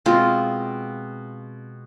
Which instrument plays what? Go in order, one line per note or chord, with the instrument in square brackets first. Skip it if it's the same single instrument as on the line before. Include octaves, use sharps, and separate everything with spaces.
[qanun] B2 G#3 C4 F4